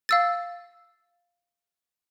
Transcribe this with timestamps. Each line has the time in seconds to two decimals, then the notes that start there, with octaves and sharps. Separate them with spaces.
0.09 F5 E6 A6